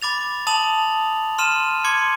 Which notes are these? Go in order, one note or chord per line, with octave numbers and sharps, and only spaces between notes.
B5 D6 A6 F7
A5 D#6 F7 F#7
C6 F6 D#7 E7
C6 D6 G#6 C#7